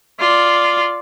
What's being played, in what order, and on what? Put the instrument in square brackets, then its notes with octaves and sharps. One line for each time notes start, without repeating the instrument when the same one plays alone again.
[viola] F4 D5